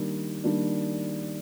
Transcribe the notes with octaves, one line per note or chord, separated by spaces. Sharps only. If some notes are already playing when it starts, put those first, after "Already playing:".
Already playing: D#3 G3 A#3 D4
D#3 G3 A#3 D4